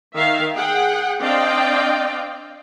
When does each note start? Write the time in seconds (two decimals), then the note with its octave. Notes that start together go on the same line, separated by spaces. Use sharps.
0.16 D#3 E5 F5
0.54 G#4 F#5 G5
1.22 C4 D4 D5 D#5 F5 G5